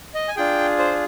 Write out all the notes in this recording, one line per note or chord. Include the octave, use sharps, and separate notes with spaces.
D#5
G#5
D4 F4 G#4 G5
C5